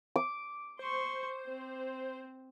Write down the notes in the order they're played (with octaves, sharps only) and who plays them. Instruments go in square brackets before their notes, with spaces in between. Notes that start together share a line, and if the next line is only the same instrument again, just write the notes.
[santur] D6
[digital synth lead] C5 [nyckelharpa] C6 C#6
[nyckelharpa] C4